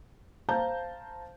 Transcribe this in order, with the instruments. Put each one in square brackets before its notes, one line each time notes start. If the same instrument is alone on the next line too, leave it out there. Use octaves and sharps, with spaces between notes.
[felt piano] C5 F5 A5 A#5 G6